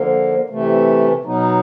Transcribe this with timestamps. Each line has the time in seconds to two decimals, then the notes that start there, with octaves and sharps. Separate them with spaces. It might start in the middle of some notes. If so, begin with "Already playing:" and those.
Already playing: D3 F3 A#3
0.50 C3 E3 A3
1.24 B2 F#3 B3 D#4